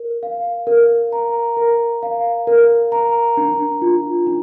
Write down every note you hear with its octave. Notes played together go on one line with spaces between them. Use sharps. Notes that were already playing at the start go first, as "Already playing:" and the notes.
Already playing: A#4
F5
A#4
A#5
A#4
F5
A#4
A#5
D4
F4
D4